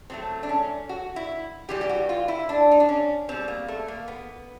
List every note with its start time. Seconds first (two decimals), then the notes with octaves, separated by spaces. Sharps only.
0.10 A2 F#3 A3 C4
0.43 D4
0.49 C#4
0.89 F#4
1.16 E4
1.69 C3 E3 G3 G4
1.81 G4
1.89 F#4
2.09 F4
2.28 E4
2.49 D4
2.71 D#4
2.80 D4
2.89 C#4
3.29 B2 G3 C4
3.48 A#3
3.68 A3
3.88 A#3
4.08 B3